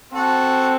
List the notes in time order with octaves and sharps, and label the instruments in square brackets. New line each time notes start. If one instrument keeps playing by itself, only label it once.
[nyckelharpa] C4 [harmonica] F#4 A4